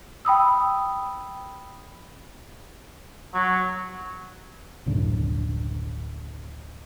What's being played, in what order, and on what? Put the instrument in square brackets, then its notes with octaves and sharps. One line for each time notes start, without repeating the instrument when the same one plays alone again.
[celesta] G5 B5 D#6 E6
[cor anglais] F#3
[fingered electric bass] F#1 D2 A2 D3